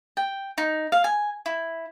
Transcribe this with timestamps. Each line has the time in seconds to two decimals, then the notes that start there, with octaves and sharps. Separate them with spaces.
0.17 G5
0.58 D#4
0.92 F5
1.04 G#5
1.46 E4